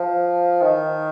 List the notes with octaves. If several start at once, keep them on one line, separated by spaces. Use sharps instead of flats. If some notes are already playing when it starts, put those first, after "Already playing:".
Already playing: F3
D#3